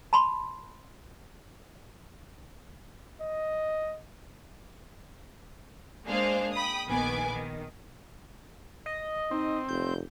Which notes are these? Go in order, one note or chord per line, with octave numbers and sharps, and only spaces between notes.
A5 B5 C6
D#5
G#3 A#3 D4 G#4 C5 F5
G5 B5 D#6
A#1 D#3 B3 B4 G#5 D6
D#3
D#5
C4 D#4
F1 G6